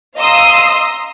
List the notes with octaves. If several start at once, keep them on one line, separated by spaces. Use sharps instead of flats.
D#5 F5 A#5 C6 D#6 E6